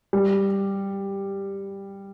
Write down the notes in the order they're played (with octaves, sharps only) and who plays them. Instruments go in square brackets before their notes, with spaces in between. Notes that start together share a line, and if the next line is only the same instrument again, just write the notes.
[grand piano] G3